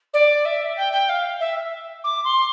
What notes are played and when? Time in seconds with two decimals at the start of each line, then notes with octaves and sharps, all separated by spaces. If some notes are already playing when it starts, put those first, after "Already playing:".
0.13 D5
0.45 E5
0.76 G5
0.92 G5
1.09 F5
1.40 E5
2.04 D6
2.24 C6